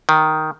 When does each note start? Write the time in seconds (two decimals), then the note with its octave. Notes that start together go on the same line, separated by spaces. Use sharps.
0.09 D#3